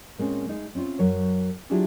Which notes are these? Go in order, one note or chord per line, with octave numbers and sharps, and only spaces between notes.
A#2 G#3 C4 C#4
G#3 D#4
C4 C#4 E4 F4
F#2 F#3 C#5
F#3 D4 E4 F4 G4 G#4